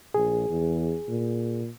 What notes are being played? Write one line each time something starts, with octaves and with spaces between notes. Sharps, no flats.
A#1 G#4
E2
A#2